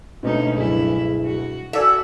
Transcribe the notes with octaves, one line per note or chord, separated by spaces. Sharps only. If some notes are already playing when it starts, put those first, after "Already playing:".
D2 B2 G#3 C#4 D#4
C#2 G2 F#3 E4 G#4
F#4
F#4 A4 D5 E5 G#5